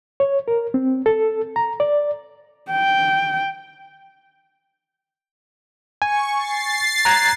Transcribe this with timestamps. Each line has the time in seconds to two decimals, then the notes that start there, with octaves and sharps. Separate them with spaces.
0.20 C#5
0.48 A#4
0.74 C4
1.06 A4
1.56 A#5
1.80 D5
2.71 G5
6.02 G#5 C#6
6.37 A6 C7
7.05 A#5 F#6 G#6